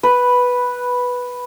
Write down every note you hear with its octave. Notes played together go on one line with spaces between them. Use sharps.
B4